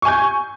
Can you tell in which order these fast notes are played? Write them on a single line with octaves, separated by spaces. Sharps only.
C#6 G#5 G6